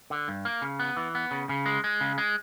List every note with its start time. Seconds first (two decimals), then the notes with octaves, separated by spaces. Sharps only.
0.10 D3
0.28 G2
0.45 A#3
0.62 C#3
0.79 B3
0.97 E3
1.15 B3
1.31 C#3
1.49 C#3
1.66 G#3
1.84 G#3
2.01 C#3
2.18 G#3